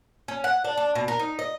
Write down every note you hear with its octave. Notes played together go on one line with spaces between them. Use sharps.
C#4
F#5
D4
D4
B2
A#4
D#4
D#5